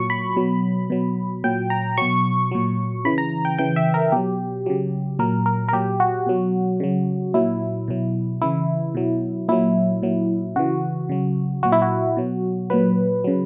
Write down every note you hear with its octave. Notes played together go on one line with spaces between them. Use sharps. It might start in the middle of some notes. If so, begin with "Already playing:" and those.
Already playing: A#2 F#3 C#6
B5
B2 F#3
B2 F#3
A#2 F#3 G5
A#5
B2 F#3 C#6
A#2 F#3
C#3 E3 B5
A#5
G5
C#3 E3 G5
E5
A#4
B2 F#3 G4
C#3 F#3
A#2 F#3 A#4
A#4
A#4
A#2 F#3 G4
F#4
B2 F#3
C#3 F#3
A#2 F#3 E4
B2 F#3
C#3 E3 E4
B2 F#3
A#2 F#3 E4
A#2 F#3
C#3 E3 F#4
C#3 F#3
A#2 F#3 F#4
E4
F#4
B2 F#3
A#2 F#3 B4
C#3 F#3